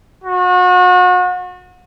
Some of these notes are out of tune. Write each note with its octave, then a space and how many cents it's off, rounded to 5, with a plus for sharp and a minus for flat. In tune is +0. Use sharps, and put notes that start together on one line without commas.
F#4 -35